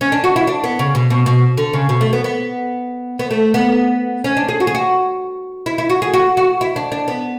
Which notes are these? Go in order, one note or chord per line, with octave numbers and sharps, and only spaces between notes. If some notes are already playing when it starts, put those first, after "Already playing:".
C#4
D4
F#4
E4
D4
B3
C#3
B2
B2
B2
D3
C#3
B2
A3
B3
B3
B3
A3
B3
C#4
D4
G#4
F#4
G#4
F#4
E4
E4
F#4
G#4
F#4
F#4
E4
D4
D4
B3